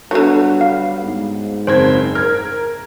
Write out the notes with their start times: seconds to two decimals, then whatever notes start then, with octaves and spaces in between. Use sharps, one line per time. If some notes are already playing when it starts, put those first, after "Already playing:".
0.11 D3 F#3 G3 B3
0.61 F5
1.04 G#2
1.67 F#1 C4 C5 G#6
2.15 A#4 F6 G#6